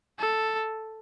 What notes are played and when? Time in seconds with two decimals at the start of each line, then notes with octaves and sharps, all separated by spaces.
0.19 A4